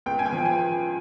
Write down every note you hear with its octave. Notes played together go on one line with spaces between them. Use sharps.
C#2 G5
G#5
G5
F3
G5
G#5